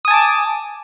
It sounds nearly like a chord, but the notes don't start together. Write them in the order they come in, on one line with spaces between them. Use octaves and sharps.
D#6 G#5 A5 D6